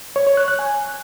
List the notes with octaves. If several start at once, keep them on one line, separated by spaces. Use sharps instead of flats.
C#5
C#5
F#6
F#6
G#5